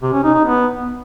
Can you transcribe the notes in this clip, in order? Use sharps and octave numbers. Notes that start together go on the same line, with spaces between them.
C3
C#4
D#4
D#4
B3